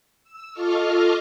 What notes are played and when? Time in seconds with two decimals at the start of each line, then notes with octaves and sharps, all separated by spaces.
0.24 E6
0.52 F4 A4 D#5 C#6 D6 F6